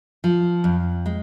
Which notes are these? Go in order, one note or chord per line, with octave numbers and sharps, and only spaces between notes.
F3
F2
G#3